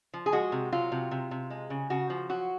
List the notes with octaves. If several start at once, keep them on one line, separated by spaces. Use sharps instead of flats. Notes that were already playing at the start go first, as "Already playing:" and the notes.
F3
G#4
G#3 F#4
C3
F#3 F4
C3
C3
C3
G#3
C#3
C#3 F#4
F3
F#3 F#4